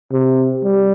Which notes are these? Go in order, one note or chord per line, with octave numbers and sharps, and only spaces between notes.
C3
G3